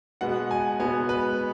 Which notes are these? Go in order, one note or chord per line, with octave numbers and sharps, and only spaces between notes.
B2 G#3 B3 F#5
G#5
B2 G#3 B3 G#5
B4